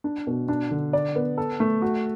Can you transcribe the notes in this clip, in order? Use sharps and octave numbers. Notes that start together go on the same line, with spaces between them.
D4
B2
D4
D3
D5
B3
A4
A3
F#4